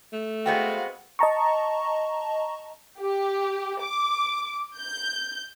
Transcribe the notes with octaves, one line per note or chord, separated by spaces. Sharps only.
A3
G#3 B3 C4 F#4 F5 G5 G6
D#5 A5 A#5 C#6
G4
D6
G6